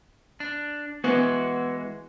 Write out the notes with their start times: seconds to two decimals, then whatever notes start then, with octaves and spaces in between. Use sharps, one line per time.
0.40 D4
1.04 E3 G#3 B3 F#4